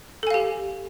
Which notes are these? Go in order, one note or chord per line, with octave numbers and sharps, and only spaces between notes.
G4 A4 F5 G#5